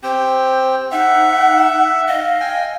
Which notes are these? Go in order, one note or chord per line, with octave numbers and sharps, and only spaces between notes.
C4 G4 C5 G5
D#4 E5 F#5
D#5 F5
G5 G#5